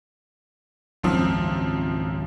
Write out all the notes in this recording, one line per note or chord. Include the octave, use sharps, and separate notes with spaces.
G#1 C#2 F#2 F3 C4